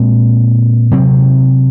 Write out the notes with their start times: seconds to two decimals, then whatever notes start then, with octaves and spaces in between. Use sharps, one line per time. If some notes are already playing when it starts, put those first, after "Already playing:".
Already playing: A#2 G#3 C4
0.91 C3 F#3 C4